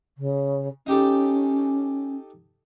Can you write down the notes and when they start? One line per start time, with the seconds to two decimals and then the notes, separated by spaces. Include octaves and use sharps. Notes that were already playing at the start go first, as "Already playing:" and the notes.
0.17 C#3
0.87 C#4 D#4 G4 A4